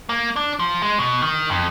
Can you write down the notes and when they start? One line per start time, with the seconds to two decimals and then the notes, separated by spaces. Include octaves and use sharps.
0.09 A#3
0.36 D4
0.59 F3
0.82 G#3
0.99 B2
1.22 D#3
1.50 F2